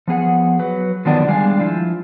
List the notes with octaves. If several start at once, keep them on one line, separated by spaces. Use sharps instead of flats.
F3 B3 G#4 F#5
F#3 B4
D3 D#3 F3 F#3 B3 D4
G3 G#3 D4 G#4 F5 G#5
F3 E4 F4